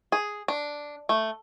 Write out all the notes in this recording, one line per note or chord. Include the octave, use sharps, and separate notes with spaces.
G#4
D4
A3